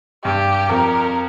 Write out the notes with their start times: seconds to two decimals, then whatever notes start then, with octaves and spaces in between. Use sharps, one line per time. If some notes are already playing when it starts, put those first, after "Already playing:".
0.24 G2 G4
0.69 F2 A#4